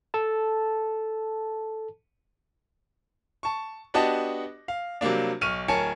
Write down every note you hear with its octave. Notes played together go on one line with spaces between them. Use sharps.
A4 A5
A5 C#6
B3 D4 F#4 G4 D#5 A5
F5
C3 F#3 G3 A#3 D4
B1 C#6 F6 D#7
D1 A#4 C#5 G#5 A5 C#7